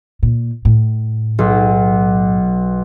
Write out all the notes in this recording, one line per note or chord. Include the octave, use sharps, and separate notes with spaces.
A#2
A2
B1